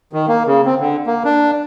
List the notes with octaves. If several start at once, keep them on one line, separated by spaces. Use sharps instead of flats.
D#3
A#3
C#3
C4
D3
A#3
D4